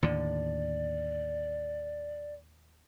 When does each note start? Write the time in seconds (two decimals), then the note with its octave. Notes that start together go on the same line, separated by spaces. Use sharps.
0.03 D#2 A2 D3 D5